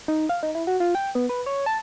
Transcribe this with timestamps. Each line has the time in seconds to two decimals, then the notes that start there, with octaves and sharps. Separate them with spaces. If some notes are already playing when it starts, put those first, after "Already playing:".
0.08 D#4
0.29 F5
0.43 D#4
0.55 E4
0.67 F#4
0.80 F4
0.95 G5
1.15 B3
1.29 B4
1.46 C#5
1.66 A5